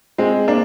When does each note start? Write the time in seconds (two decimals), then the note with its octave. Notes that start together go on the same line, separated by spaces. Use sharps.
0.18 G#3 C4
0.48 A#3 D4